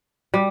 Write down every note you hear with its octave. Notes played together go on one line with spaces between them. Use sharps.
G3